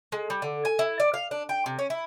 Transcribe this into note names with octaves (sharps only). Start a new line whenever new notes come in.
G#3
G3
D3
G#5
E4
D5
F5
D4
G5
C3
C#4
E4